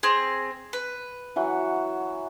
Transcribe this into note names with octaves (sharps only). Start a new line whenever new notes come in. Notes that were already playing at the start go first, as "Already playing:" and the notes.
C4 G#4
B4
E3 F#3 F#5